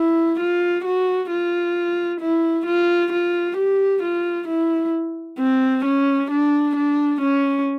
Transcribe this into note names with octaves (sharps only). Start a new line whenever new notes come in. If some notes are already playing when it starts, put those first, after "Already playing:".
Already playing: E4
F4
F#4
F4
E4
F4
F4
G4
F4
E4
C4
C#4
D4
D4
C#4